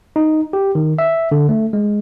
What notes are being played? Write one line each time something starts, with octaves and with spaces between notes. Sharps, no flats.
D#4
G4
D#3
E5
D3
A3
G#3